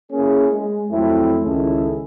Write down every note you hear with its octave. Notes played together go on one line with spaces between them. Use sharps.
A#3 C#4 E4 G#4
G#3
F2 F#3 A3 C4 E4
C#2 D#3 C#4 E4 G#4 A4